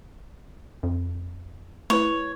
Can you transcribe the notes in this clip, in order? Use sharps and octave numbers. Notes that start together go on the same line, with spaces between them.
F2
A3 E4 B4 C#5